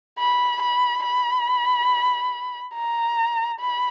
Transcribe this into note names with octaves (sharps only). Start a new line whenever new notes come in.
B5
B5
B5
A#5
B5